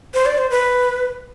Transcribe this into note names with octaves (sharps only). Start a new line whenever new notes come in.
C5
D5
C5
B4